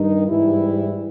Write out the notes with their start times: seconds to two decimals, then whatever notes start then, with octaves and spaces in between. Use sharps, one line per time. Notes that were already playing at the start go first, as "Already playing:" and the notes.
Already playing: G2 D#3 D#4
0.28 G#2 E3 G3 E4